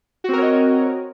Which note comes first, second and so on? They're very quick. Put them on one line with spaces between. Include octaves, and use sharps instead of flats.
F#4 C4 A#4 C#5 D#5